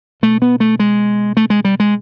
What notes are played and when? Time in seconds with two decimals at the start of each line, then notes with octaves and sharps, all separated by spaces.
0.22 B2 A3
0.42 B3
0.60 A3
0.80 G#3
1.37 A3
1.50 G#3
1.65 G3
1.80 G#3